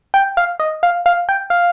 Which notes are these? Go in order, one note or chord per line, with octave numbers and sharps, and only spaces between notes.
G5
F5
D#5
F5
F5
G5
F5